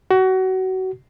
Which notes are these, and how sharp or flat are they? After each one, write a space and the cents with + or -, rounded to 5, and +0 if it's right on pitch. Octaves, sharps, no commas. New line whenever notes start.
F#4 +25